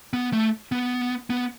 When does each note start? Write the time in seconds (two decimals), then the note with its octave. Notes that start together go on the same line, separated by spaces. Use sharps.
0.13 B3
0.33 A3
0.72 B3
1.30 B3